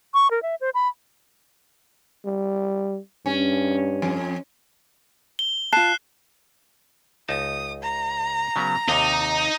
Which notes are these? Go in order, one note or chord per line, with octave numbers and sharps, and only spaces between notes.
C#6
A#4
E5
C5
B5
G3
G2 C#4
F2
G7
F4 A5 F#6 C7 E7
C#2 D#4 A5 D#6
A#5
C#3 F#3 B3
D#2 C3 D#4 G#5